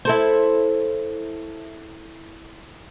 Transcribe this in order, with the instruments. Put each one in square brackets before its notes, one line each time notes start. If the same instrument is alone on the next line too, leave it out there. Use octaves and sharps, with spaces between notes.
[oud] E4 A4 C5